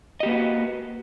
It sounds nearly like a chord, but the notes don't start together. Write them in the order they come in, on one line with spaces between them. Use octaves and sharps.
D#5 G4 A#3 B4 F#4